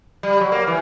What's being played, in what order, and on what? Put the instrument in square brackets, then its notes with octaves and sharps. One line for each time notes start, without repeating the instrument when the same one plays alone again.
[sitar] G3
F#3
A#3
E3